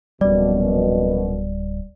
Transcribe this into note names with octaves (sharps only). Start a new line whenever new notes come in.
D1 A#1 F#2 B2 G3 D5